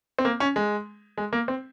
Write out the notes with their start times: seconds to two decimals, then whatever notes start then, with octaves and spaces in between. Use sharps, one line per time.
0.19 C4
0.25 A#3
0.40 C#4
0.56 G#3
1.18 G#3
1.33 A#3
1.48 C4